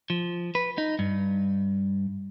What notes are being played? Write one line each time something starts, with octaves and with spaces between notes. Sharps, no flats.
F3
B4
D#4
G2